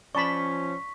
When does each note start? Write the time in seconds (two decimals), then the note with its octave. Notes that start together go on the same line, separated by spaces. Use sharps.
0.15 F3 C#4 D5 A5 B5 C#6 B6